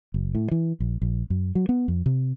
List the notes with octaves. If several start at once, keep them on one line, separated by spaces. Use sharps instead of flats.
F#1
A2
E3
A#1
A#1
F#2
F#3
B3
F2
C3